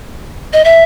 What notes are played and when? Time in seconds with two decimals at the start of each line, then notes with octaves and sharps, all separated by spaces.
0.53 D#5
0.65 E5